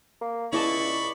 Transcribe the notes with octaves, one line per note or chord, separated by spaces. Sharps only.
A#3
C#2 E4 D5 D#5 A5 B5 C#6